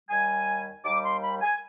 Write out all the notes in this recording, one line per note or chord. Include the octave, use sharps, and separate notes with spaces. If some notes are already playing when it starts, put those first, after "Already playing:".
D#2 D#3 G3 G#5
D#2 D#3 G3 D6
C6
B5
G#5